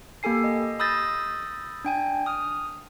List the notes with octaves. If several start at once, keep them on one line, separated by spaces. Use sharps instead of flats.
A#3 G4 A4 G#5 C7
D#5
B5 D#6 E6 G6 A6 A#6
D4 G5 G#5
D#6 F6